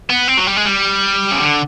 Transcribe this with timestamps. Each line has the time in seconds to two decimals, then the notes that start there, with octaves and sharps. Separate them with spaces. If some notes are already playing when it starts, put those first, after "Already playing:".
0.10 B3
0.28 C4
0.37 F#3
0.47 G3
0.57 G#3
0.65 G3
1.31 C#3
1.40 D3